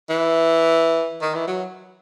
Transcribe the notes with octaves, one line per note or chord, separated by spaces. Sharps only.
E3
D#3
E3
F#3